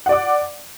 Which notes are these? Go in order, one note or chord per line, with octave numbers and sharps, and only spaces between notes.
D5 F#5 D6